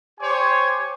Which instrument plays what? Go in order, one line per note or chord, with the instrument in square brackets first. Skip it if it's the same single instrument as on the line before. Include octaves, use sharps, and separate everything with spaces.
[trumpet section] G4 C5 C#5 G#5 D6